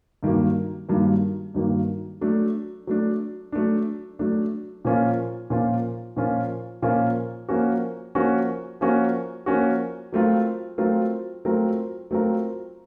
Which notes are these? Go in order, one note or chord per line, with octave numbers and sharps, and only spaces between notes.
G2 D#3 F#3 A#3
G2 D#3 F#3 A#3
G2 D#3 F#3 A#3
F#3 A3 D4
F#3 A3 D4
F#3 A3 D4
F#3 A3 D4
A#2 F3 A#3 C#4 F4
A#2 F3 A#3 C#4 F4
A#2 F3 A#3 C#4 F4
A#2 F3 A#3 C#4 F4
F3 A#3 C#4 F#4
F3 A#3 C#4 F#4
F3 A#3 C#4 F#4
F3 A#3 C#4 F#4
F#3 A3 C4 F4 A#4
F#3 A3 C4 F4 A#4
F#3 A3 C4 F4 A#4
F#3 A3 C4 F4 A#4